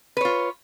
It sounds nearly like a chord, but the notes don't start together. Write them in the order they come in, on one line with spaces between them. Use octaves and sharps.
B4 C#5 F4